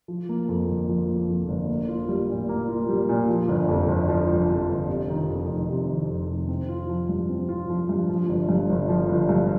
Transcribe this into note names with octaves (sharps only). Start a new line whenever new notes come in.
F3
A#3
F2
G1
F3
A#3
F2
G1
A#3
F4
G3
A#2
A#3
F4
G3
A#2
F3
G1
F2
G1
F3
G1
F2
G1
C3
D#3
F2
F1
C3
D#3
F2
F1
C4
F4
F3
G2
C4
F4
F3
G2
F3
G1
G2
G1
F3
G1
G2